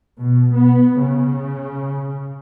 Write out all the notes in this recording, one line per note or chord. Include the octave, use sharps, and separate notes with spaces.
B2
B3
C#3